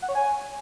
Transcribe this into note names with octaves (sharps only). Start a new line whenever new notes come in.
F#5
C#5
G#5